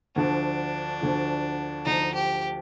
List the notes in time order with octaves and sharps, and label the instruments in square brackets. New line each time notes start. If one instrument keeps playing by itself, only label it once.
[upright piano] D2 D3 F3 [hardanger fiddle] D4
[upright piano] D2 D3 F3
[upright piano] D2 D3 F3 [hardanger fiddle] D#4
[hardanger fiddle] G4